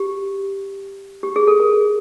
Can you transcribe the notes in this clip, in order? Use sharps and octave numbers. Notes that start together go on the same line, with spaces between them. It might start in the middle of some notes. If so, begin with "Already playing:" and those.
Already playing: G4
G4
G#4
A4
A#4